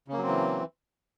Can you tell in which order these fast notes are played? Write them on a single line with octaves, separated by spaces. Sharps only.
C#3 A#3 F#3 C4 E3